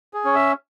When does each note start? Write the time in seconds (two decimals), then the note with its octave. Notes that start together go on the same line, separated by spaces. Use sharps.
0.14 G#4
0.25 C#4 C#5
0.35 E5